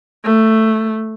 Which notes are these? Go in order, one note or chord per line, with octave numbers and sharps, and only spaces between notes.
A3